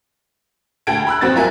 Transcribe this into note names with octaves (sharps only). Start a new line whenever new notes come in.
D2 A4 G5 A5 G#6 D7
B5 E6 F#6
F2 C4 F#4 A6
G1 F4 A#4 E5 G#5